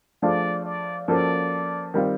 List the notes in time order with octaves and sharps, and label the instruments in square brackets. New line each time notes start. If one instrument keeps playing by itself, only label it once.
[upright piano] F3 A3 D4 F4 G#4 [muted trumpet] D5
[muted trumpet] D5
[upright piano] F3 A#3 C#4 F#4 A4 [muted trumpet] D5
[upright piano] D#3 G3 C4 F4